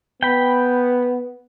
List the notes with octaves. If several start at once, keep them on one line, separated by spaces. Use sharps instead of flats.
B3 G5 B5